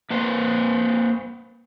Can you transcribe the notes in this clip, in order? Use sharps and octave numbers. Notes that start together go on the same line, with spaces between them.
A#3 B4 C5